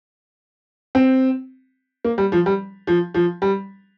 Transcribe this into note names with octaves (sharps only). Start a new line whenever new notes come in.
C4
A#3
G3
F3
G3
F3
F3
G3